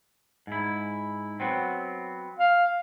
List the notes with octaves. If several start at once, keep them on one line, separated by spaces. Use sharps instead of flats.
G#2 E4
F#3 B3 C4
F5